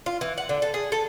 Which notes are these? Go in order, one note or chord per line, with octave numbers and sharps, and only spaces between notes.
F4
E3
F#5
D3
A4
G#4
A4